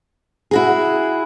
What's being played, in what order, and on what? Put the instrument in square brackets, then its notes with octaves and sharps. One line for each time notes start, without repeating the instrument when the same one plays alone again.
[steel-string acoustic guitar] E4 F#4 G#4